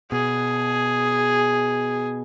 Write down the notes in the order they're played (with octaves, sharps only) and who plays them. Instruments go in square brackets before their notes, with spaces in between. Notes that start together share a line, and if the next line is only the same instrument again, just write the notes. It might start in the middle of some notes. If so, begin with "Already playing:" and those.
[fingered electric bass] B2 [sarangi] G#4